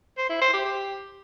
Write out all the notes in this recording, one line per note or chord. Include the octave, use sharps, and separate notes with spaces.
C5
E4
C5
G4
G4